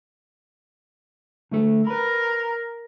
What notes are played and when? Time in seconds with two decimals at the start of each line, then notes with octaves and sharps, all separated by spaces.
1.51 D3 A3 A4
1.87 A#4 B4 B5